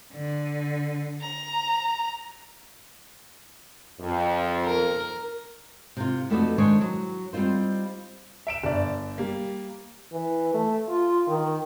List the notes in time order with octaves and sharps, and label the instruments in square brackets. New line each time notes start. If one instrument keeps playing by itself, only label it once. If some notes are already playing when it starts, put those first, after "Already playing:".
[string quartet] D3
A#5
[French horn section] F2
[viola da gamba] A#4
[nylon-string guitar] C3 F4
F2 A3 B3 D#4 F#4 D5
D#3 G#3 D4 C5 C#5
F#3
G3 C4 D#4 F4 C5
[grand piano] E5 D7 E7
G1 D5
G3 A#3
[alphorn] E3
A3
F4
D#3